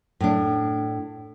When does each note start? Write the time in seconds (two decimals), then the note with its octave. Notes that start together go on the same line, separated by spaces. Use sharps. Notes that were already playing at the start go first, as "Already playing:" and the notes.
0.20 A2 D4